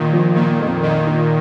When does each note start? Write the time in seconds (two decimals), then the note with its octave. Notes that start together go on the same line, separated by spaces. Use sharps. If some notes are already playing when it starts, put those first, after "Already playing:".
Already playing: A#2 D#3
0.13 F3
0.35 A#2 D#3 A#3
0.60 F2
0.83 A#2 D#3 D#5
1.06 D#4